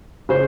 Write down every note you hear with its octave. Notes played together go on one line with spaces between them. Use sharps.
C#3 C5